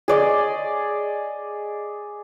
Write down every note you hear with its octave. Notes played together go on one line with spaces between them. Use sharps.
G#4 D5 D#5